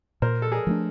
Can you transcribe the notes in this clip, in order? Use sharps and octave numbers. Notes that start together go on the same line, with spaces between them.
A#2 A#4 C5
A4
G#4 A#4
F3 A3 D4